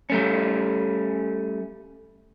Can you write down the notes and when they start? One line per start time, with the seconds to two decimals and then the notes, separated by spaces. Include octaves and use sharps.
0.10 G3 A3 C#4